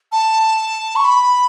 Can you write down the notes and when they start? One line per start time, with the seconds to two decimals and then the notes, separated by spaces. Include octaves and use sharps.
0.12 A5
0.96 C#6
1.05 B5